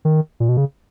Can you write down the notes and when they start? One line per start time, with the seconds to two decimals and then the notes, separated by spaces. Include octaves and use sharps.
0.05 D#3
0.40 A#2
0.49 B2
0.57 C#3